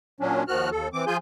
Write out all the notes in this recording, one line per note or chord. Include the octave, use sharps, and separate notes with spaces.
A#2 F#3 C#4 D4
D#2 D#3 F3 F#4 F6 F#6
D#2 A4
E3 C4 D6
F3 F4 G#4 G#5 G6